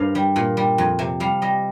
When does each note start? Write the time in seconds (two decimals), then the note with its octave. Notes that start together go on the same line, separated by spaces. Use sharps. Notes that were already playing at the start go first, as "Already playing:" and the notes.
Already playing: G2 A#4 C5 F5
0.15 G3
0.36 A#2
0.57 G3
0.78 F2
0.99 C3
1.20 G3 F5
1.42 G3 D#5